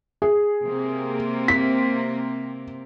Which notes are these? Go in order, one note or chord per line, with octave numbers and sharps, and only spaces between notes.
G#4
C3 A#3 C4
B6